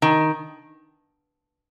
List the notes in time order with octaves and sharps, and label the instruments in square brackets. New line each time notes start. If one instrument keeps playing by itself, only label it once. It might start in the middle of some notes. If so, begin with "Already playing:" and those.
[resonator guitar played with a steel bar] D#3